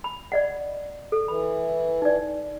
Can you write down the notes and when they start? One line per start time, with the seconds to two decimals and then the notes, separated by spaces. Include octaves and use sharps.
0.04 B5
0.32 D5 D#5 F#5
1.12 A4
1.28 E3 B5
2.02 D#4 D5